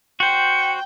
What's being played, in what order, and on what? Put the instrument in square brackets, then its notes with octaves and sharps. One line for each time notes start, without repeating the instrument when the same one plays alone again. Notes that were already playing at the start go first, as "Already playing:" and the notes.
[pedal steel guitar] F#4 C5 [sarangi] G5 [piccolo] C#7